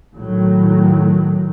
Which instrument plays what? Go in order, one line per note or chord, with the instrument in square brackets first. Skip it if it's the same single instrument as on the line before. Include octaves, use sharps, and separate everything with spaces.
[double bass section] A2 D#3 F#3